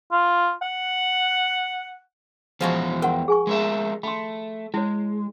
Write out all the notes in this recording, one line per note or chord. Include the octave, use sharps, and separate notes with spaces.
F4
F#5
E2 F3 G#3 F#4 G#4 F5
A#4 F#5 G5 C6
G#4 G#5 C#6
G#3 A#4 E5
A3 B5 C6
G#3 E4 C#5